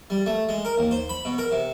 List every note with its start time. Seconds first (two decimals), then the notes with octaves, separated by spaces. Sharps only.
0.10 G3
0.26 A3
0.49 G#3
0.65 A#4
0.78 D#2
0.91 C5
1.09 B5
1.25 B2
1.38 A#4
1.51 C3